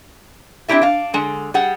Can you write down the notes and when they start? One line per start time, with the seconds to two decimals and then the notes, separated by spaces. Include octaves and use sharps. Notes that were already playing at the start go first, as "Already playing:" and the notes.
0.68 C4 D4 E4 G4 E5
0.82 D4 F5
1.14 D3 G#3
1.54 G3 G#4 F#5